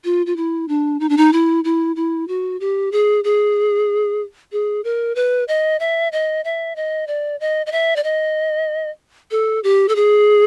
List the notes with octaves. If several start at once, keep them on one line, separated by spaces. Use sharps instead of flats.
F4
F4
E4
D4
D#4
D4
D#4
E4
E4
E4
F#4
G4
G#4
G#4
G#4
A#4
B4
D#5
E5
D#5
E5
D#5
D5
D#5
D#5
E5
D5
D#5
A4
G4
A4
G#4